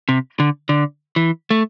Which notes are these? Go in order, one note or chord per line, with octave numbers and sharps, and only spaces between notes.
C3
D3
D3
E3
A3